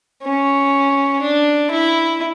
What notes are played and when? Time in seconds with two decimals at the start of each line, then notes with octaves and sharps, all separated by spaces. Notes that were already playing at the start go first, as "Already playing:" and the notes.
0.23 C#4
1.22 D4
1.71 E4